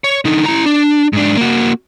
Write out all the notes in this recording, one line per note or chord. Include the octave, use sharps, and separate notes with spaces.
C#5
D3 D#4
E4 A#5
D4
G#2 D4
A#3 F#4